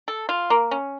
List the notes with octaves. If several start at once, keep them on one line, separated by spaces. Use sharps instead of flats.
A4
F4
A#3
C#4